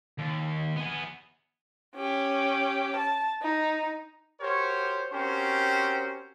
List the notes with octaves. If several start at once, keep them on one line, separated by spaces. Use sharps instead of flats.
D#2
B3 G#4
C#4 G4
A5
D#4
F#4 G4 A#4 C5 C#5
C4 C#4 F#4 G4 A#4 C5